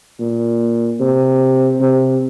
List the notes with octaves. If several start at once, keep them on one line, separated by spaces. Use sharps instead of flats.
A#2
C3
C3